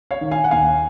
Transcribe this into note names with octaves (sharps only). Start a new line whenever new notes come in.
C#5 F5
D#3
F5 G#5
F#5
D#2 F5 G#5